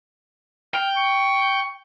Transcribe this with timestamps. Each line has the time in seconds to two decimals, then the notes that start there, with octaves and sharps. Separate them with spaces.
0.74 G5 F6
0.97 C#6